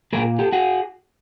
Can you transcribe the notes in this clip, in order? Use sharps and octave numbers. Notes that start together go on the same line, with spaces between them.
A#2 F#3 A#3 G#4 A#4
G4 A4
F#4 G#4